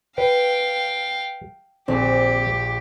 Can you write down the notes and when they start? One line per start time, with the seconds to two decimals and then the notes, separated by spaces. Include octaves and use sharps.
0.18 B4 F5 G5
1.88 A#1 C4 G4